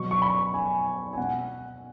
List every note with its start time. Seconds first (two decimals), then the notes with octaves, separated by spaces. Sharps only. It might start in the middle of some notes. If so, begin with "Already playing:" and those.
Already playing: B2 F#3 B3 C#6
0.11 C#6
0.22 B5
0.54 G#5
1.13 G#5
1.17 B2 F#5